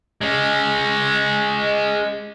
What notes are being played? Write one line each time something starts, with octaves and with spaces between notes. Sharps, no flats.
G#3 C#4